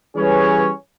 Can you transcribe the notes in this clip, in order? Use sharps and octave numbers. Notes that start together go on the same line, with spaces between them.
E3 G3 C#4 G#4 B4 C#5